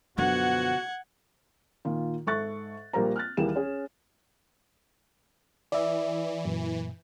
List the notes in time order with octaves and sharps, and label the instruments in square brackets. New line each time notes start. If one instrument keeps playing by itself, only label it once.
[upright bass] F#2 D3 [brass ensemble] B2 F3 B3 [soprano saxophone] F#4 [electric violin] F#5 G#6
[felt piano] A#2 D#3 F4
G#2 A4 E5 C#6 F#6 A6
A#1 G3 A#3 A#4 C5 A#5
F6 F#6 A6
D#2 E3 G3 G#4 A#4 E7
C#4 G#4
[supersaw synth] E3 [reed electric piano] D5 E5
[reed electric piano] F#2 A#2